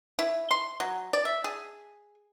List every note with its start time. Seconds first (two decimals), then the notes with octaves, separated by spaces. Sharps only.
0.19 E4
0.51 C6
0.80 F#3
1.13 D5
1.25 E5
1.44 G#4